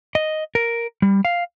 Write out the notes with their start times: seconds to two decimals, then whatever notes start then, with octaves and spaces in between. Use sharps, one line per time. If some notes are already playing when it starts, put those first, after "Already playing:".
0.15 D#5
0.55 A#4
1.02 G3
1.25 F5